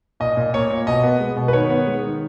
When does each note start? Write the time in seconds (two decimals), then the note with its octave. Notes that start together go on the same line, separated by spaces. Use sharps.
0.20 A#2 D#5
0.37 A#2
0.54 A#3 C#5
0.70 A#3
0.87 B2 D#5
1.03 B3
1.20 G#3
1.36 B2
1.48 B4
1.53 D#3 C#5
1.70 B3
1.87 G#3
2.03 D#3